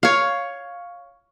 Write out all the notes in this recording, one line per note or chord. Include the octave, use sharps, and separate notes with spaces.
C#5 F5